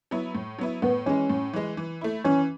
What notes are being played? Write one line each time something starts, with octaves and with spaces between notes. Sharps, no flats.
F#3 B3 E4
A2
F#3 B3 E4
A2 B3
E3 G#3 C#4
A2
E3 G#3
E3
A3 E4
E3 C#4